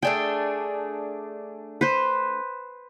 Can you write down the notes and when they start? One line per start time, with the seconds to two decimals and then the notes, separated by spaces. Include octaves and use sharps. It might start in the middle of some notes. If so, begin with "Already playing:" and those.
0.03 A3 D4 G#4 G5
1.81 B4 C5